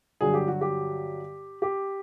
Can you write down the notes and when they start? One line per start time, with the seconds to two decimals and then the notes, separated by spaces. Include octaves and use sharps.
0.21 G2 D3 F#3 G#4
0.34 G4
0.48 F#4
0.61 G4
1.62 G4